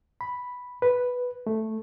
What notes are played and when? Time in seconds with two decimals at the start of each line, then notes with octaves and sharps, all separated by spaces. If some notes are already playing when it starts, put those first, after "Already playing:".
0.21 B5
0.82 B4
1.47 A3